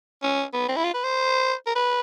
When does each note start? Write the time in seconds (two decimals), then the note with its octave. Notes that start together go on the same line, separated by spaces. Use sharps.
0.23 C#4
0.53 B3
0.68 C4
0.76 E4
0.84 F4
0.94 B4
1.04 C5
1.67 A#4
1.75 B4